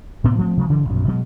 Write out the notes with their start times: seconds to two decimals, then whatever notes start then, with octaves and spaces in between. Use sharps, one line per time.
0.24 A2 C3 B3 C4
0.38 F3 A3 A#3 C4
0.57 C3 F3 F#3 G#3
0.69 G2 C#3 E3 F3
0.89 A#1 F#2 B2
1.08 B2 F#3 G#3